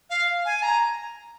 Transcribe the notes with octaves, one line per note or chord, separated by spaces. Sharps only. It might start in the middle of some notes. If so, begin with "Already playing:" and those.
F5
G#5
A#5